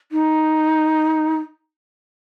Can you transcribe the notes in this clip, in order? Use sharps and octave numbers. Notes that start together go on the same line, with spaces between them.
D#4